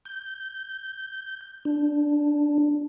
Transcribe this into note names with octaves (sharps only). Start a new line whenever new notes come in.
G6
D4